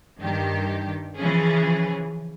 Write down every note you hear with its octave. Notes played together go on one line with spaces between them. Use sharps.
G2 D#3 G4
C#3 E3 F3 C#4 G#4